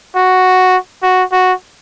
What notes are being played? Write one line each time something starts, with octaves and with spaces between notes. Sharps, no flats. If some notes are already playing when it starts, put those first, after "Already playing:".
F#4
F#4
F#4